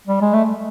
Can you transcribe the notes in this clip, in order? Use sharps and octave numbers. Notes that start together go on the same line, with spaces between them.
G3
G#3
A3